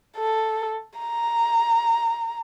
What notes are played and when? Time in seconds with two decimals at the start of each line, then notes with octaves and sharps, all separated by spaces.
0.17 A4
0.99 A#5